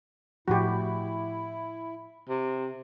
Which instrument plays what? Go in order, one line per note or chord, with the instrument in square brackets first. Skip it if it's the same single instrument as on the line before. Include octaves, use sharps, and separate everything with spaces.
[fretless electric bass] A2 F3 [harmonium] E4 [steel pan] F#4 G4
[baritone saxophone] C3